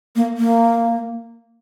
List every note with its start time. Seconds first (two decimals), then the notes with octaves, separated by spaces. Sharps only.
0.16 A#3
0.37 A#3